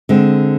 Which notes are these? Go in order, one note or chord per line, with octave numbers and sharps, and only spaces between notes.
D3 G#3 C4